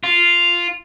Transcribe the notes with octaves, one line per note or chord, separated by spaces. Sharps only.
F4